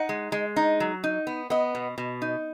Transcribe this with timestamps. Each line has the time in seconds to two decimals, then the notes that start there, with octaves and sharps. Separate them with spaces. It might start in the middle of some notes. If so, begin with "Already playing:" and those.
Already playing: D#4 F#5
0.09 G#3
0.32 G#3
0.56 D#4
0.80 F#3
1.04 D#4
1.27 B3
1.50 B3 D#5
1.75 B2
1.98 B2
2.22 D#4